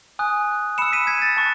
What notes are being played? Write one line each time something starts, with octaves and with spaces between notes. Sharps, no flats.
G#5 D#6 F#6
B5 E6 C#7 E7
B6 D#7
G#6 B6
A6
A5 C#6 F#6 A6